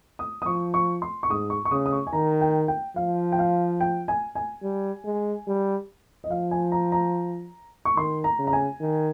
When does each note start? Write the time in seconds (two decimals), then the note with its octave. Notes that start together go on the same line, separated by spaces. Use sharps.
0.19 D#6
0.42 D#6
0.46 F3 C#6
0.74 C#6
1.02 C6
1.23 C#6
1.29 G#2 D#6
1.50 C#6
1.65 C#6
1.71 C#3 D#6
1.86 D#6
1.93 C#6
2.07 G#5
2.13 D#3 A#5
2.41 G5
2.68 G5
2.96 F3 F5
3.32 G5
3.39 F5
3.81 G5
4.08 G#5
4.35 G#5
4.63 G3
5.05 G#3
5.47 G3
6.24 D#5
6.30 F3 F5
6.51 G#5
6.72 A#5
6.92 A#5
7.85 C#6
7.97 D#3 C6
8.24 A#5
8.38 C#3
8.47 A#5
8.53 G#5
8.80 D#3